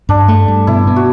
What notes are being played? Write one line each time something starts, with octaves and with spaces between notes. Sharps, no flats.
G2 D4
A3
G2
B2 E4
B2
F#4